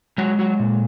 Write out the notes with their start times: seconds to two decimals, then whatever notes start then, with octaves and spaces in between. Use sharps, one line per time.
0.18 F#3 G#3 F#4
0.39 F#3 F#4
0.59 A#2